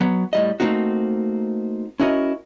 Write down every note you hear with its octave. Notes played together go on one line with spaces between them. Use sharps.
F#3 B3
A2 G3 D#5
A3 A#3 C4 D#4 F#4
C#4 E4 F#4 A#4 D#5